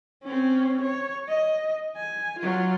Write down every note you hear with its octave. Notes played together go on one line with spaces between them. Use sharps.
C4 C#4
C#5
D#5
G#5
F#3 F4